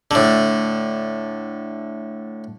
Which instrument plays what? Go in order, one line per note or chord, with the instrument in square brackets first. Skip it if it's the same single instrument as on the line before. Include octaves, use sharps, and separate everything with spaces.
[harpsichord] A2 D3